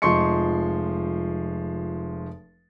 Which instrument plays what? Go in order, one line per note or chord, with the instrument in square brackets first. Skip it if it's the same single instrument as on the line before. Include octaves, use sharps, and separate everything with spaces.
[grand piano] F1 F3 G#3 C6 C#6 C#7